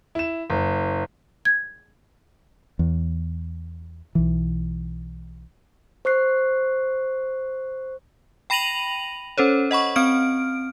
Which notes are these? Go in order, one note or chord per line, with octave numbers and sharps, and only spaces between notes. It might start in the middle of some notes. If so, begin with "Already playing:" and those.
E4 E7
F#1
G#6
E2
B1 E3
C5 C#6 F#6 C7
G5 B5 A#6 D#7 F7 F#7
C#4 A4 C5 C#5
D#5 F#5 B5 C#6
C4 F6 D7